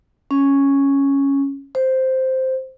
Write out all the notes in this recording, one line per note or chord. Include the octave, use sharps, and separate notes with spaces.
C#4
C5